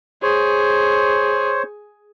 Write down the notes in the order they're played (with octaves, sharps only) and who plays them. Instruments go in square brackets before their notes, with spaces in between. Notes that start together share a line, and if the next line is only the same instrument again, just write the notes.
[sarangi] G#4 [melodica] C5 C#5